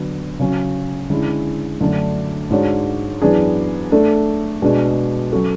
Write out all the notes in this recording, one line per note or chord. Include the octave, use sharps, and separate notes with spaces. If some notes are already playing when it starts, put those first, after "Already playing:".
Already playing: D3 F#3 B3
C#3 F#3 C#4
D3 G#3 C#4 E4
F#2 D3 A3 D4
G#2 G#3 D4 F#4 C#5
F#2 E3 B3 D4 G#4
A3 D4 A4
B2 G#3 D4 G#4
F#3 C#4 F#4 A4